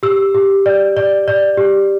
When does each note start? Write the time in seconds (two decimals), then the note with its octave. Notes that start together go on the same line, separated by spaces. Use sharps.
0.03 G4 E6
0.35 G4
0.66 D5
0.97 D5
1.28 D5
1.57 G4